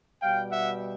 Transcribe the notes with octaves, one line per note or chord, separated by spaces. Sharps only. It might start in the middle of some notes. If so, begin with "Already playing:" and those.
B2 G3 F5 G5
E5 F#5